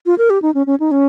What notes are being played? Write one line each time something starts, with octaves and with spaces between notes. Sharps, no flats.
F4
A#4
G4
D#4
C#4
C#4
D#4
C#4